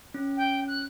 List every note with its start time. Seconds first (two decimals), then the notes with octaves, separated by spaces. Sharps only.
0.14 C#4
0.37 G5
0.67 F#6